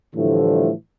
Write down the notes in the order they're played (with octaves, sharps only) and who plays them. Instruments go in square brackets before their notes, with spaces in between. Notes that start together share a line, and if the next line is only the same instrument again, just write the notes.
[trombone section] A2 D3 E3 F3 G3 A3